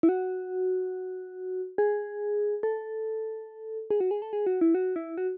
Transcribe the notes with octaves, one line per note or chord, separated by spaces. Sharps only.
E4
F#4
G#4
A4
G#4
F#4
G#4
A4
G#4
F#4
E4
F#4
E4
F#4